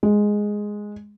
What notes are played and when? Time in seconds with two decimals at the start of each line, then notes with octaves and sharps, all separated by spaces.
0.03 G#3